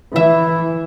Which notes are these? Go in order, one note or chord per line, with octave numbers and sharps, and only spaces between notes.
E3 E4 E5